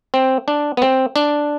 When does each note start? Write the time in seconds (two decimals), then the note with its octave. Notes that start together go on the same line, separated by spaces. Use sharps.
0.14 C4
0.48 D4
0.77 B3
0.82 C4
1.16 D4